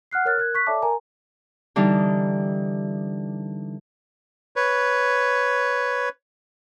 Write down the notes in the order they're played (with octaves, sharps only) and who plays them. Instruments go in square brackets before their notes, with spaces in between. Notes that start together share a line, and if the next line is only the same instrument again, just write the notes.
[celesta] F#5 F6 F#6 C7
A#4 C#5 F6 F#6 A6
A#4 F#6 G#6
C#6 F#6 B6
A4 C#5 D5 E5 A5 D6
A#4 G#5 A#5
[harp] D3 E3 G3 D#4
[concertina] B4 C#5